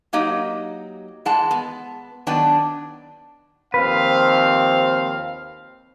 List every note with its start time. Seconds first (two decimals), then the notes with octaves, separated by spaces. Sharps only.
0.13 F#3 A#3 D#4 G4 D#5
1.25 E3 G#3 F#5 A5
1.51 B3
2.27 D#3 F#3 B3 D4 B4 G5
3.74 D#2 F3 C4 B4 F5